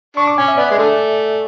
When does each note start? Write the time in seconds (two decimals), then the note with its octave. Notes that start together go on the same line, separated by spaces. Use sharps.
0.17 D4 C#6
0.27 D6
0.37 C#4 G#5
0.48 E5
0.57 B3 D5
0.71 G#3
0.78 D3 A3